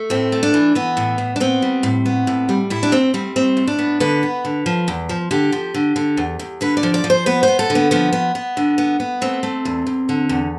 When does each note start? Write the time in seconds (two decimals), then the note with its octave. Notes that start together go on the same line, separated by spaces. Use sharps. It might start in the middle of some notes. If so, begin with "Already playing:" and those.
Already playing: A3
0.10 A2 C4
0.32 A3
0.43 D4
0.54 E3
0.75 E3 B3
0.97 A2
1.18 A2
1.36 D4
1.40 B3 C4
1.62 G3
1.83 A2
2.06 B3
2.27 A2
2.49 G3
2.70 A2 E4
2.83 D4
2.92 A2 C4
3.14 G3 C4
3.36 A2 C4
3.57 A2
3.67 D4
3.79 B3
4.00 D3 B4
4.23 B3
4.45 D3
4.66 F3
4.88 E2
5.09 F3
5.31 D3 G4
5.52 F3
5.74 D3
5.96 D3
6.17 E2
6.39 E2
6.61 D3 B4
6.77 D5
6.83 F3
6.94 D5
7.04 F3
7.10 C5
7.26 B3 B4
7.43 C5
7.48 B3
7.59 A4
7.70 D3
7.75 B3
7.91 F3 B3
8.13 B3
8.35 B3
8.57 D3
8.78 B3
9.00 B3
9.21 A3 C4
9.43 A3
9.65 E2
9.87 E2
10.09 D3
10.29 E2